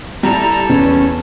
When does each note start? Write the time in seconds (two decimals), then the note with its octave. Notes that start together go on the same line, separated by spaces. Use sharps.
0.23 G3 E4 A4 A#5
0.69 E2 C#4